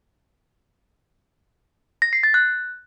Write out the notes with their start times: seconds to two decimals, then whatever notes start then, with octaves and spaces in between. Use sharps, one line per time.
2.02 A#6
2.13 C7
2.23 A6
2.34 F#6